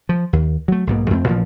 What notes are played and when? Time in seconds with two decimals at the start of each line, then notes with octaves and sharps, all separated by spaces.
0.09 F3
0.33 D#2
0.68 F#3 A3
0.87 B1 G#2 B2 A#3
1.10 F2 A3 A#3 C4
1.27 A1 A#2 D#3 F3